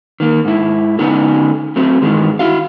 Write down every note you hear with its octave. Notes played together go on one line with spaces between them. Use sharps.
D#3 A#3
G#2 E4
D3 B3 C#4 D#4 A4
F#3 A3 C4
G2 D#3 E3 G#3
E4 F#4 F5